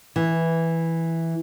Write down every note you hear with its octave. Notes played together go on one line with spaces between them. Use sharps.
E3